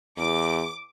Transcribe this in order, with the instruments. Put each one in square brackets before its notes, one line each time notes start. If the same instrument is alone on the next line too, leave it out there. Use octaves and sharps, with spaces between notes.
[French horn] E2 [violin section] D6